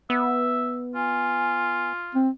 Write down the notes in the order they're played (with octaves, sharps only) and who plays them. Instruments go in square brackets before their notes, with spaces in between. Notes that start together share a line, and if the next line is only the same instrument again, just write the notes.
[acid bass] B3 [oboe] E5
[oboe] F4 [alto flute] G#5
[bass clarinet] C4